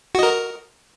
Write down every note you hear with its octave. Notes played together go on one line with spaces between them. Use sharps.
F#4 A#4 D#5